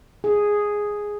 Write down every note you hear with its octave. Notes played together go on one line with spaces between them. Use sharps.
G#4